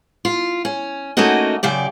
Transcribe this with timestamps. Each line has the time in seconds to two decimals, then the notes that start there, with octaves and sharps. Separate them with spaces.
0.25 F4
0.65 C#4
1.17 A3 A#3 C#4 D#4 F#4 D#5
1.63 F#2 C#3 G4 D5